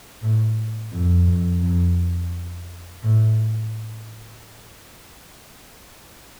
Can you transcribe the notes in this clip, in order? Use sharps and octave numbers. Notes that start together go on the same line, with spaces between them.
A2
F2
F2
F2
A2